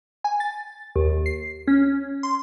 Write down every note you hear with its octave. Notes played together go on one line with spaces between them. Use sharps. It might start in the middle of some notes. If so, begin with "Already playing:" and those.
G#5
A6
D#2
C7
C#4
C6